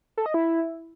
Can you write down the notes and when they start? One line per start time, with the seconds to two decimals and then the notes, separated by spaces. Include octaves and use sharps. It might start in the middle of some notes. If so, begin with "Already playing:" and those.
0.17 A4
0.26 D#5
0.34 E4